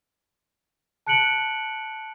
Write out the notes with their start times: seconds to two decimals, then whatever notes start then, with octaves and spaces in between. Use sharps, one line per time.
1.07 A5 F#6 C#7 D7 F#7